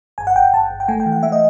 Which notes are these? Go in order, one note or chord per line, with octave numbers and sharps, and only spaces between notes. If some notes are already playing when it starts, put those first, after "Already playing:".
G1 G#5
F#5
G1 G5
G1 A5
G1
G5
A3 G#5
G5
E3
F#5
A3 E5
D#5